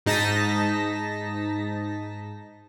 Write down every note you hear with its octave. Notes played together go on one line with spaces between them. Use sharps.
G#2 D#4 A5 A#6 B6